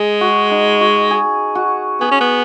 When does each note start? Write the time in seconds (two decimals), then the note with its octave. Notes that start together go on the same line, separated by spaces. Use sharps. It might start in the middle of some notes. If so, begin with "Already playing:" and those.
Already playing: G#3 G#4
0.21 F#4
0.51 D#4
0.81 F#4
1.11 G#4
1.55 F#4
2.01 B3 G#4
2.11 C#4
2.21 B3